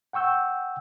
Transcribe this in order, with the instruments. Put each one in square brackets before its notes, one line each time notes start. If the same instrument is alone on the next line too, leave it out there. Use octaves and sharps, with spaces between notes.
[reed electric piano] F#5 G5 C#6 E6 G6